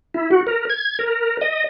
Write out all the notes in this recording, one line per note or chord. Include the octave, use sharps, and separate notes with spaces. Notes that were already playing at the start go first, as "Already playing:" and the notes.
E4
F#4
A#4
G#6
A#4
D#5